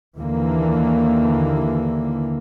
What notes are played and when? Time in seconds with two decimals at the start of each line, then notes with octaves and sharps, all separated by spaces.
0.19 D#2 D3 E3 A#3